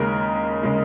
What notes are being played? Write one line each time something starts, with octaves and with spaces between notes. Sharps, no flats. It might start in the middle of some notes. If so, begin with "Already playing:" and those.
Already playing: D#2 C#3 G#3 A#4
C#3 G#3